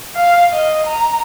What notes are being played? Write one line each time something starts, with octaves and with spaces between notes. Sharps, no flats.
F5
D#5
A#5